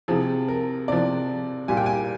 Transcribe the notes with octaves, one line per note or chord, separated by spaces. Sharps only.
C3 F3 G#4
A#4
C3 F3 D5
A#2 G3 G#5
G5
G#5